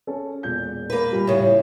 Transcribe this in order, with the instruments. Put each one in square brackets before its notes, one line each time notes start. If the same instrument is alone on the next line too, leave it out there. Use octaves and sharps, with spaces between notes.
[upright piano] C#4 A4
E1 A#2 G6
[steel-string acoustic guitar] A#3 B4
[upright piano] A#2 G3
[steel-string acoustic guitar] A2 C#3